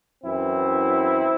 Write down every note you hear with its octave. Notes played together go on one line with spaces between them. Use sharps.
F#2 E3 C4 E4